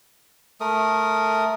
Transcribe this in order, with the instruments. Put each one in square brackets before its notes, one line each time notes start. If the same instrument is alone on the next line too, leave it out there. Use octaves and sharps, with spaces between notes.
[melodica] A3 A#4 D#6